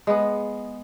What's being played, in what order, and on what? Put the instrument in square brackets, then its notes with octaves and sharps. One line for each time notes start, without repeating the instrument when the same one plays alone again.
[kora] G#3 B3